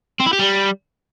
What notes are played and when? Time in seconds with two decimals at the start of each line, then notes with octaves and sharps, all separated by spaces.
0.20 C4
0.26 E4
0.33 G4
0.39 G3